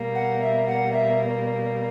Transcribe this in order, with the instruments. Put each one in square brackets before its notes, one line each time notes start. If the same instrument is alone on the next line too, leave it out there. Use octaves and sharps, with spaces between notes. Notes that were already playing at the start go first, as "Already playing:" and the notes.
Already playing: [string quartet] B2 G3 A#3
[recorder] F#5
E5
F#5
E5